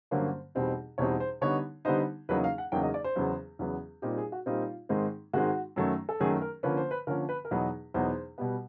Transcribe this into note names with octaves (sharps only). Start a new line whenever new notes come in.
G2 D3 F#3 A#3 C#4 C5
E2 B2 G3 C4 D#4
E2 B2 G3 C4 D#4 C#5
C5
D3 G3 B3 D#4 C#5
D3 G3 B3 D#4 C5
E2 C#3 F#3 A#3 D#4 B4
F5
F#5
E2 C#3 F#3 A#3 D#4 G5
D#5
D5
C5
E2 C#3 F#3 B3
E2 C#3 F#3 B3
A#2 G3 C4 D#4 G4
G#4
F#4
A#2 G3 C4 D#4 F4
G#2 D#3 G#3 C4 D#4
G#2 D#3 G#3 C4 D#4 F#4
F#2 D#3 F#3 A3
A4
F#2 D#3 F#3 A3 G#4
A#4
D3 F3 A#3 C#4 B4
C5
B4
D3 F3 A#3 C#4 A#4
B4
A#4
E2 B2 F#3 B3 D#4 B4
E2 B2 F#3 B3 D#4 C5
B2 G3 B3